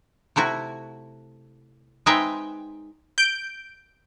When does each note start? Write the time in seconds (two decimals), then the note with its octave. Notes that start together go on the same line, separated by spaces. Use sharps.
0.36 C3 A3 E4 F#4
2.06 G#3 C4 D#4 B4 E5 G5
3.18 G6 D7